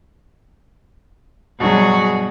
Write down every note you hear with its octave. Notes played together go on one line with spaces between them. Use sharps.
G2 B2 F#3 F#4 G#4